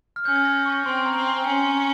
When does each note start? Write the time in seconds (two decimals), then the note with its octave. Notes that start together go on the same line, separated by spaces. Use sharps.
0.16 F6
0.25 C#4 G6
0.36 G#6
0.45 A#6
0.66 C#6
0.86 C4 C6
1.06 A#5
1.16 C4
1.27 G#5
1.46 C#4